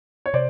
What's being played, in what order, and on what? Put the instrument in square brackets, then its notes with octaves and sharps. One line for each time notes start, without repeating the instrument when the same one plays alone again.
[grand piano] C#5
[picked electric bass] C3 [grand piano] C5 D5